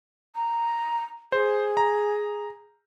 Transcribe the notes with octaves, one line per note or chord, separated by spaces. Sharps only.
A#5
G#4 C5
A#5